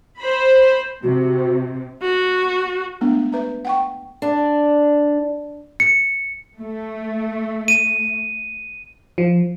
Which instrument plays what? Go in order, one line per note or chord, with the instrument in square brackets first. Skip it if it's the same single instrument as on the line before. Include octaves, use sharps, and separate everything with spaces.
[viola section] C5 B5
[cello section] C3 [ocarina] F#4
[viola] F#4
[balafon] G#3 A3 B3 D4
B4 E5 A#5
F#5 G5 C#6
[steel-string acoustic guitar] D4
[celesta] C#7
[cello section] A3
[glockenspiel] D#7
[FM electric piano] F3